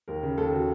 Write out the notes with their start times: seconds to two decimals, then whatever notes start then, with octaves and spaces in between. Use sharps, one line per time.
0.08 D#2 A#4
0.23 C#3
0.38 D#2 A4
0.52 C#3 F#4